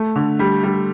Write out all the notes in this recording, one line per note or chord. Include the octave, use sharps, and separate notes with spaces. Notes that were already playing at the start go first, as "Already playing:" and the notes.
Already playing: A3
D3
G3
G3